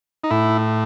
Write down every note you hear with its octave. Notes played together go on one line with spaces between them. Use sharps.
D#4
A2 E4